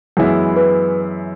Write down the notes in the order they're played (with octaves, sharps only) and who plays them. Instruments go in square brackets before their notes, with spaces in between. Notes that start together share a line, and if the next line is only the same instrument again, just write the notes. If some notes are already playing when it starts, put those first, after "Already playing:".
[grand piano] F#2 E3 G#3 B3 E4
[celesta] B4